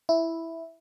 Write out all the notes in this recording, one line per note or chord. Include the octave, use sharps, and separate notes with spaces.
E4